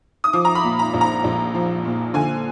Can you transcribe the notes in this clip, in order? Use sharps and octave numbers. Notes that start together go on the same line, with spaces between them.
D#6
F3 D6
A#5
B5
A#2
A#5
A#1
A#5
A#1
F3
A#2
D3 G#5